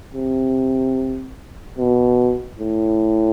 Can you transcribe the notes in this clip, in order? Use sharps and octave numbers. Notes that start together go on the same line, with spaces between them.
C3
B2
A2